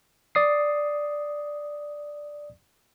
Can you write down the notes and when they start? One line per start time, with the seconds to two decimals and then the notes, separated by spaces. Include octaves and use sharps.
0.35 D5 D#6 C7